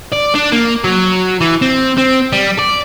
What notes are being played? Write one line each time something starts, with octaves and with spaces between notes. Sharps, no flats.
D5
D4
A#3
F#3
E3
C4
C4
G3
D5